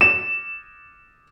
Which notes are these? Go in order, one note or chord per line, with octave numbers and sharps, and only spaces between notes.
E7